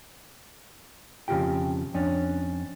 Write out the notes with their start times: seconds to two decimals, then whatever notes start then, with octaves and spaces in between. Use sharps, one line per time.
1.28 F2 C#3 C4 F4 G4 G5
1.94 F2 C#4 D4